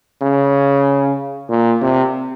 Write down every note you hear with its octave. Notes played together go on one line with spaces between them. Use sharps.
C#3
A#2
C3